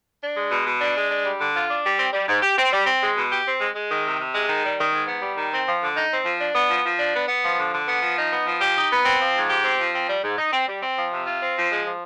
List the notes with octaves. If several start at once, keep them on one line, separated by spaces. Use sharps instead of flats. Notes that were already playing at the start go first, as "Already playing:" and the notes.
D4
G#3
B2
B2
D4
G#3
D4
G3
D3
F4
D4
G3
C4
G3
G#2
G4
C4
G3
C4
G#3
B2
G4
C4
G#3
G#3
D#3
C3
C3
G#3
D#3
G3
D#3
G#2
B3
G3
D#3
C4
F3
D3
D#4
C4
F3
D4
B3
F3
F3
D4
B3
B3
F3
D3
D3
B3
F3
D#4
B3
F3
G4
D#4
B3
C4
F3
G#2
G4
C4
F3
C4
G3
G#2
D#4
C4
G3
C4
F3
C3
F4
C4
F3
G#3
F3